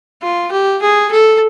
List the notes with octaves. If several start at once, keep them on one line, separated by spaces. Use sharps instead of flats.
F4
G4
G#4
A4